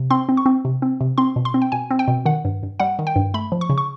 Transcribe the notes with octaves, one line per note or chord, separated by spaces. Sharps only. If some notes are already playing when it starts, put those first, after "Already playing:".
Already playing: C3
C4 C6
C4
C#6
C4
C3
C4
C3
C4 C6
B2
C6
C4
G5
B2 G#5
C4
G5
B2
D#3 F#5
G2
G2
G3 F#5
D#3
G5
G2
A3 B5
F3
C#6
C#3
C#6